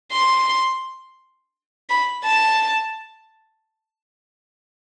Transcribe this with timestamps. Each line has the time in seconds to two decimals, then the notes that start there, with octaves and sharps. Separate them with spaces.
0.12 C6
1.90 B5
2.25 A5